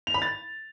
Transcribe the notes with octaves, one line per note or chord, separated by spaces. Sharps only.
F7
B5
A6